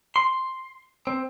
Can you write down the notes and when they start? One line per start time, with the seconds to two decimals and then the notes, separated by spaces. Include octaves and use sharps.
0.16 C6
1.07 C4